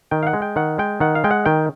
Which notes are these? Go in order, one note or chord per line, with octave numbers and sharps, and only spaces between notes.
D#3 G5
F5
F#5
G#3
G5
D#3 F#5
G#3 G5
D#3 F#5
F5
G#3 G5
F#5
D#3 G5